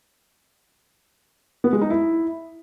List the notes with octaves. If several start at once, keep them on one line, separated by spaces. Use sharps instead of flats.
B3
G#3
D#4
E4